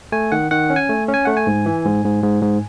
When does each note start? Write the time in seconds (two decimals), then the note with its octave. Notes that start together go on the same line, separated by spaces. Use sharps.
0.12 A3 G#5
0.32 D#3 F#5
0.51 D#3 F#5
0.70 C#4
0.76 G#5
0.89 A3
1.08 C#4
1.14 G#5
1.25 A3 F#5
1.37 G#5
1.47 G#2
1.66 E3
1.85 G#2
2.04 G#2
2.23 G#2
2.43 G#2